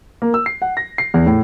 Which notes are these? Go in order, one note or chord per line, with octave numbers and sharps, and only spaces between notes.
A#3
E6
C7
F#5
A#6
C7
E2
A2